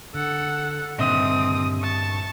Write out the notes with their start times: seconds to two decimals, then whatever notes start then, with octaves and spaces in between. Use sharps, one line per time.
0.14 D3 A4 F#5
0.98 G2 A#2 D3 D#3 C4 D#5 E5 D#6
1.81 A5 C#6